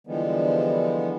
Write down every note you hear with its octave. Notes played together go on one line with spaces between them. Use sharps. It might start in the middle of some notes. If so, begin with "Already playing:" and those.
D3 E3 F3 G3 G#3 B3